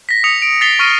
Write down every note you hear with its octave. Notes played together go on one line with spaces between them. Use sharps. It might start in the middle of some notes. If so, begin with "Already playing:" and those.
A#6 B6
D#6 C#7 F7
D7
A6 B6 C7 F7 G7
C#6 F6 A#6 D#7